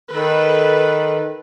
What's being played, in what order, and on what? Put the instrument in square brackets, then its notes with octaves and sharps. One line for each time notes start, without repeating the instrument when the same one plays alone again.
[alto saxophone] D#3 [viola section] A4 B4